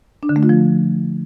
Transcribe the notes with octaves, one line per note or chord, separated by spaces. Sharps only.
D4
D3
A3
F4
F3